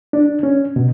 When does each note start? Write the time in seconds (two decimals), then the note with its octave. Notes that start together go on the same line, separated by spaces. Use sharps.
0.13 D4
0.43 C#4
0.76 B2